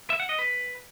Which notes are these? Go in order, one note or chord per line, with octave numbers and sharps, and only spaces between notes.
E5
F#5
D#5
B4